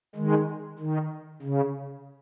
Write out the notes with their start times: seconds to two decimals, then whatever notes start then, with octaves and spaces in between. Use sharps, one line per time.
0.15 D#3 G#3
0.79 D#3
1.42 C#3